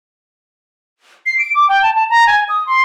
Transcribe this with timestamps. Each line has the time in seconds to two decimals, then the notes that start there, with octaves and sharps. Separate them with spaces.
1.26 C7
1.39 D7
1.55 D6
1.69 G5
1.83 A5
1.95 A5
2.10 A#5
2.27 G#5
2.49 D#6
2.66 C6